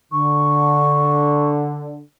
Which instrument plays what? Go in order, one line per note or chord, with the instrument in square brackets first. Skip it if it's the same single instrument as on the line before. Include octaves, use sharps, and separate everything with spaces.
[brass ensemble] D3 [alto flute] C#6